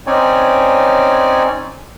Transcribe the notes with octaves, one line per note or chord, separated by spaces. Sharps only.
C4 C#4 D#4 C#5 D5 G#5